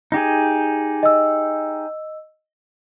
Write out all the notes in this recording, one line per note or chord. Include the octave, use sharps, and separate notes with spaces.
D#4 G4 G#4
D#5 E6